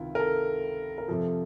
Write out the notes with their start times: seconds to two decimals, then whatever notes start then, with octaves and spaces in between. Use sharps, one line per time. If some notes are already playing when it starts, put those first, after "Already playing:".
Already playing: C#2 C3 D#3 E4 F4
0.15 A#4
0.19 A4
0.98 A#4
1.08 F2 C3 F3 A4